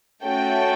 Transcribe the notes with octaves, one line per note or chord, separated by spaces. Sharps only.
A3 C#4 F#4 A4 G5